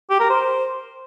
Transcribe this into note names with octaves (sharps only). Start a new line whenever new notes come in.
G4
A#4
C5